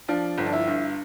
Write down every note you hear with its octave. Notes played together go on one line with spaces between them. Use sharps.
F3 D4
G1
D4
E4
G2